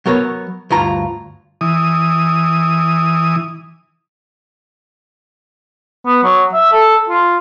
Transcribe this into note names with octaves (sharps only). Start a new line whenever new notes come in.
F#3 B3 A#4 C#5
D2 G2 F4 A#5
E3 D#6
B3
F#3
E5
A4
F4